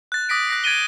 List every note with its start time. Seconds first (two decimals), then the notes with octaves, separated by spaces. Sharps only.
0.12 F#6 A6
0.29 D6 D#6 A#6 B6 D7
0.48 F#6 A#6 C7
0.64 G#6 A6 D7 D#7 G7